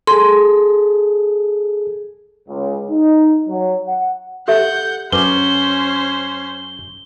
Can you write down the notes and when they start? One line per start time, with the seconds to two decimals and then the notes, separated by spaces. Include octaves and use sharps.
0.07 G#4 A4 C6
2.48 C#2
2.90 D#4
3.48 F#3
3.85 F#5
4.48 G4 A4 E5 F#5 G6
5.12 F#2 C#4 B4 C5 D6 G7